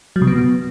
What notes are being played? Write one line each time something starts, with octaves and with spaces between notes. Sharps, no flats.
F#3
C3
B3